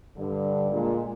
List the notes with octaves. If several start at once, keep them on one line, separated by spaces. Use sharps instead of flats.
G2 D3
A#2 G#3